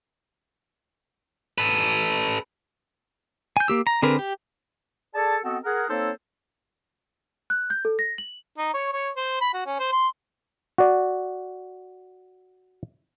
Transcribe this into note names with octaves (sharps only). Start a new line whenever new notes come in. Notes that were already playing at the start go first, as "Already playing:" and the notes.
A4 B4
G#5 G6
A#3 G4 E6
A#5
D3 C4 G#4 A#4 B4
G4
G#4 A4 D5 A5
B3 C4 F#4 A4 D#5 F#5
G#4 A#4 F#5
A#3 C4 D#4 A4 C5 C#5
F#6
G6
A4
A#6
F#7
D#4
C#5
C#5
C5
B5
F#4
C#4
C5
C6
F#4 D5